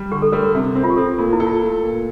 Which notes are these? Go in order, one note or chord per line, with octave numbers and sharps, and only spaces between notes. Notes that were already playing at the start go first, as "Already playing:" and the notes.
Already playing: G3
D3 G4
A4
G3 A#4
C3
C4 A#4
F4
G4
C4 A4
A#2 F4
E4
A4
F4
A3
A#2